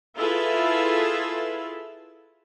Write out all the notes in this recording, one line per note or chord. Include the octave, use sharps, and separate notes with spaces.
E4 F4 G#4 A4 B4 E5